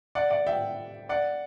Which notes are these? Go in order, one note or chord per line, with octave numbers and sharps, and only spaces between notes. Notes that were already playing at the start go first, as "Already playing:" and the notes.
D5 F#5
D5 F#5
E5 G5
D5 F#5